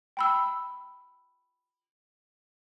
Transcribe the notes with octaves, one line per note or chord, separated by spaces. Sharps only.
G5 B5 E6